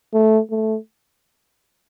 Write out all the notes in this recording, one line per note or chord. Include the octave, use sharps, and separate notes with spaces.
A3
A3